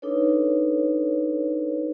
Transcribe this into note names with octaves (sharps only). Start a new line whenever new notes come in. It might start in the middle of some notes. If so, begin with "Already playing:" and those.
D4 D#4 A4 B4 C#5